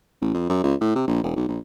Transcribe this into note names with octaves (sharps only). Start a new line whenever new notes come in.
A1
F2
F#2
C#2
A2
C3
A#1
E1
B1
A#1